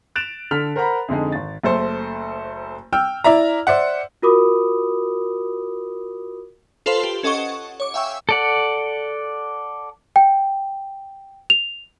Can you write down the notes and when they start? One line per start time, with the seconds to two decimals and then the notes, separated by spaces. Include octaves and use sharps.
0.16 F#6 A6 D7 E7 F7
0.51 D3 A4 F6 B6 F7
0.76 A#4 C5 F#5 A#5 B5
1.08 F2 D3 G#3 D#4
1.32 G#1 A6
1.64 F#1 A3 A4 C5
2.93 G5 E6 F6
3.24 E4 D5 E5 A#5
3.67 C5 D5 E5 F#5
4.22 F4 F#4 A#4 B5 D6 D#6
6.86 F4 A4 B4 C5 F5 C6
7.03 G4
7.23 C#4 A4 D#5 F#5 C#6 G7
7.38 F#5
7.80 C#5 D6
7.94 E5 F5 G5 G#5 C#6 E6
8.29 A4 D5 F#5
10.16 G5
11.50 F7